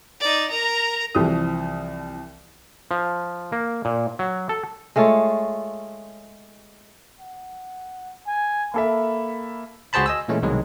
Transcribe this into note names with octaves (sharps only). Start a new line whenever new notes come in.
D#4 D5
A#4 A#5
C2 E3 F3 G4 D#6
F3
A#3
A#2
F#3
A4
G#3 A3 F4 C#5
F#5
G#5
A#3 A4 E5 B5
C#2 F#4 G#4 C5 A5 B5
D#5 G#5 E6
A#2 E3 G#3 A3 C#4
C2 B2 D#3 F#3 G#3